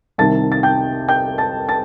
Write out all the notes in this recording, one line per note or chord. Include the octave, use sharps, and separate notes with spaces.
C2 C3 D#3 A5 A6
A6
G5 G6
G5 G6
A5 A6
A5 A6